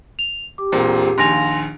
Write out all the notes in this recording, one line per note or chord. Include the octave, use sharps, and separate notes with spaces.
F7
G4 D6
E1 A#2 C4
A#1 D#2 G#5 C6 A#6 F7